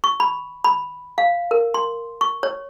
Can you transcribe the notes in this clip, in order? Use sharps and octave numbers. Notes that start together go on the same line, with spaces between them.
C#6
B5
B5
F5
A#4
C6
C#6
C#5